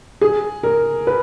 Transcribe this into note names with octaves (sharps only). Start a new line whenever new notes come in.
G#4
A#4
B4